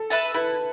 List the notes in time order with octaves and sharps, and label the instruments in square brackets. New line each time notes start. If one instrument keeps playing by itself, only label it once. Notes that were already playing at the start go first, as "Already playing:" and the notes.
Already playing: [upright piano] A4
[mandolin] B4 E5 A5
[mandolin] E4 [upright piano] B4